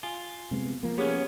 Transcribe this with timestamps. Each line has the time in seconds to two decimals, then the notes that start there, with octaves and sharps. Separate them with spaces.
0.03 F4 G#5
0.51 C3 G#3 B3
0.83 F3 A#3
0.98 B3 C#4 G4 G#4 C5 C#5